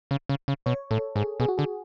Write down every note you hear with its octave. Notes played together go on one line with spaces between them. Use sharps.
C#3
C#3
C#3
B2 C#5
A2 A4
G#2 G#4
B2 G#4
F#4
D3 G#4